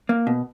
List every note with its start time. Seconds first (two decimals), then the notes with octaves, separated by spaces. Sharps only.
0.09 A#3
0.27 B2